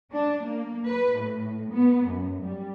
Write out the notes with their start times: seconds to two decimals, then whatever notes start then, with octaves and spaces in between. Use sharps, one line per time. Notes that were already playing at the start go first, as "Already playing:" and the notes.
0.13 D4
0.45 A#3
0.86 B4
1.19 A2
1.71 B3
2.07 F#2
2.41 G3